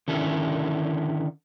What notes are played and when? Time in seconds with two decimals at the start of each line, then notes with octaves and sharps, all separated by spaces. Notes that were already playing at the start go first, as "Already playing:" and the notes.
0.08 D3 D#3 C#4 E4 A4 A#4